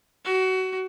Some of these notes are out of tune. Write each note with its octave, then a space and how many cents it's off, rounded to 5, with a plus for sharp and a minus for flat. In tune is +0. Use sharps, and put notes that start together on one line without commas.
F#4 +25